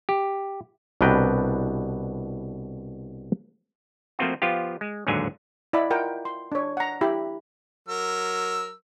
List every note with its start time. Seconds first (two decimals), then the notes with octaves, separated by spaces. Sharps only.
0.09 G4
1.01 C2 B2 D4 B4 G5 A#5
4.19 F3 A3 A#3 C4 F4 F#4
4.42 F3 B3 F4 G4
4.81 G#3
5.07 A1 D#2 G#2 D3 F#3 G#5
5.73 E4 D5 D#5 F#5 B5
5.90 F4 A#4 F#5 G5
6.25 C6
6.52 D4 C#5
6.77 F#5 A#5
7.01 E4 G4 B5
7.88 F#3 A#4 E6